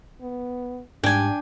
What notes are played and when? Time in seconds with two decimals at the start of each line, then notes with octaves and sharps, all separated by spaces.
0.21 B3
1.04 G#2 G3 D4 G5 G#5